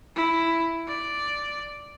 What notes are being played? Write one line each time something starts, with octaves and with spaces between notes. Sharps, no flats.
E4
D5